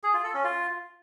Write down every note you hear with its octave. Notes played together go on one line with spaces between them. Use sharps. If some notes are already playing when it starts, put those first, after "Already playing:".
G#4
F4
A4
C#4
F4